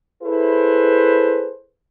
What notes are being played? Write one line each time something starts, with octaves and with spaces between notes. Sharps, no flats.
E4 G#4 A4 B4 C5